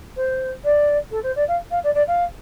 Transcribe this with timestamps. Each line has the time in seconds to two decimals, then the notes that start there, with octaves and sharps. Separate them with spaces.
0.17 C5
0.64 D5
1.11 A4
1.23 C5
1.36 D5
1.48 F5
1.71 F5
1.84 D5
1.95 D5
2.08 F5